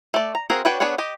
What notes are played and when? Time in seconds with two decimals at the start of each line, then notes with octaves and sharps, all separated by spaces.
0.14 A3 D5
0.35 A#5
0.50 C4 F#4 G#4 A#4 F5
0.65 D4 F#4 B4 C#5 G5
0.80 B3 D4 G#4 C#5 F#5
0.98 G4 D#5